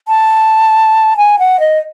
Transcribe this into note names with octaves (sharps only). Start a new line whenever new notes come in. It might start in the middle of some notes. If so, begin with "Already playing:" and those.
A5
G#5
F#5
D#5